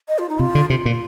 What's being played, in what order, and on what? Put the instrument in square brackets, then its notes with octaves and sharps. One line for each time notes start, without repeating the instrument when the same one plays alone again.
[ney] D#5
F4
D#4
[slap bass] C3 [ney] F4
[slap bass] D3
[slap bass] C3 [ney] F4
[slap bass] A#2